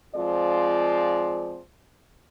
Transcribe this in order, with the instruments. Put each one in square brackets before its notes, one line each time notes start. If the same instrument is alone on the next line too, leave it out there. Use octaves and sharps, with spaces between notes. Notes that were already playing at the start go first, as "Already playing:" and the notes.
[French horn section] F3 G#3 C4 F4 D5